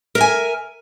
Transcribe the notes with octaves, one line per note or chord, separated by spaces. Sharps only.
A#4 E5 G#5